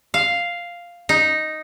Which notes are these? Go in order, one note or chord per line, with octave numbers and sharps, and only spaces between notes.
F5
D#4